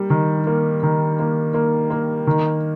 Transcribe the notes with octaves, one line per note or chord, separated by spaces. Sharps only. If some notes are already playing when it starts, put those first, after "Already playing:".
Already playing: G3 A#3
D#3
A#3
D#3
A#3
A#3
A#3
D#3